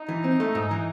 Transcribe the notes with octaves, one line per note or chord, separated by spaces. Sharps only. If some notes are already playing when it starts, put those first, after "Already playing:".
Already playing: D#4
E3
C4
A3
G#2
E3